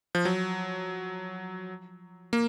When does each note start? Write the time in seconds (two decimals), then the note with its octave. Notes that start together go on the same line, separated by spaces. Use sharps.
0.15 F3
0.25 F#3
2.33 A#3